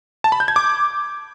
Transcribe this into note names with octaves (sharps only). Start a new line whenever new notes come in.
A5
B5
G6
G#6
D6